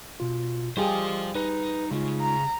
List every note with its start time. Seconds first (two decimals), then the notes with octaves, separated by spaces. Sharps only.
0.20 B2 F4
0.77 G3 G4 G#4 C5 D#5 F5
1.35 D#4 B4
1.91 C#3 G#3 D#4 F4
2.20 A#5